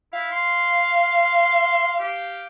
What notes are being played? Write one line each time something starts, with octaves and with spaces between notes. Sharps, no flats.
E4 F5
C6
G4 F5